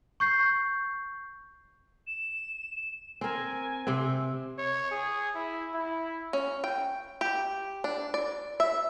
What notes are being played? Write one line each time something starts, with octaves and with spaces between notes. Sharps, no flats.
C#6 G6 C7
E7
C4 A#4 G#5
C3 C4
C#5
G#4
E4
E4
C#4
G5
G4
D4
D5
E5